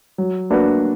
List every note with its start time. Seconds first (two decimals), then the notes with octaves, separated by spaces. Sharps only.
0.18 F#3
0.50 A#3 D4 F#4 B4